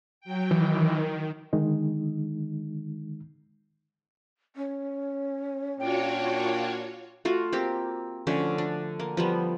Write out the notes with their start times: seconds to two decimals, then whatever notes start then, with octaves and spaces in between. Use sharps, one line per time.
0.21 F#3 G5
0.51 D#3 E3
1.53 D3 D#3 G#3 D#4
4.56 C#4
5.80 A#2 D4 F4 F#4 C#5 G5
7.25 A3 F4 F#4
7.53 A#3 C4 G4
8.27 D3 F3 A3 C#4
8.58 D4
9.00 A#3
9.17 F3 G3 B3